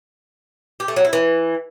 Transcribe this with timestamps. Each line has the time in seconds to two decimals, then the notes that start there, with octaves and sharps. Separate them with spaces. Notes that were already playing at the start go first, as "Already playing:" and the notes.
0.80 G4
0.88 A3
0.96 F#3
1.05 E4
1.13 E3